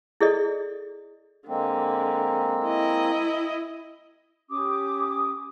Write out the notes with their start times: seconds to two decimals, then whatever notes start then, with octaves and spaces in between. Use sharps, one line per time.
0.21 E4 G#4 A4 D5 D#5
1.48 D3 G#3 A#3 C4
2.65 E4 D#5
4.50 C#4 G4 D6 D#6